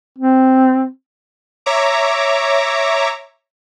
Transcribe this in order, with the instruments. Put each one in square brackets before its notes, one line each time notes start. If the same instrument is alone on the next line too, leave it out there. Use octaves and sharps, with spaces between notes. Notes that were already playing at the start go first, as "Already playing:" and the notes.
[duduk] C4
[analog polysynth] C#5 E5 A#5 D6